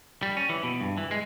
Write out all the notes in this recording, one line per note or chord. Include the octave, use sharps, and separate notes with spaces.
G3
C#4
E3
B2
G2
E3
G#3